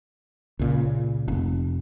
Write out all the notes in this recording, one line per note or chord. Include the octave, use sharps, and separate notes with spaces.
C#2 A#2 C#3
F1